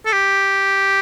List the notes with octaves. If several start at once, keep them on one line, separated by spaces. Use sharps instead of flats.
A4
G4